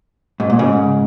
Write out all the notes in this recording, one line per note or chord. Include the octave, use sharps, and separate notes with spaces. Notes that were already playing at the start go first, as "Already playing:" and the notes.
G#2
A#2
G#2 C#3